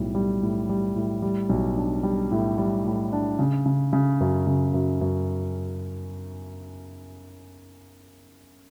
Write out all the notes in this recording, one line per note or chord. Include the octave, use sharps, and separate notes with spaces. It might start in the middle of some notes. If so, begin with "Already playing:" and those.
Already playing: B1 A2 G3
G3
A2
G3
A2
G3
B1
D4
G3
A2
G3
A2
D4
C#3
C#3
C#3
F#2
C#3
F#2
F#2